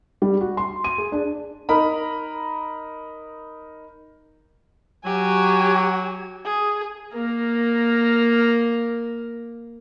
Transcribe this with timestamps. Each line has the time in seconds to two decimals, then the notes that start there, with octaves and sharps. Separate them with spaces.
0.22 G3
0.41 F#4
0.57 C6
0.84 D#7
0.98 G#4
1.12 D4
1.69 D#4 A#4 A#5 B5
5.04 F#3 G4 G#5
6.45 G#4
7.14 A#3 A#4